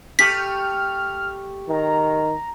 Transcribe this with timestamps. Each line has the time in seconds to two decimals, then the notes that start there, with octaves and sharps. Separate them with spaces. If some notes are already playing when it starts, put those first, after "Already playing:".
0.19 A3 G4 F6 B6
1.68 D#3 A#5